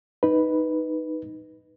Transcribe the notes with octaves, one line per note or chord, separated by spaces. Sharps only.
D#4 B4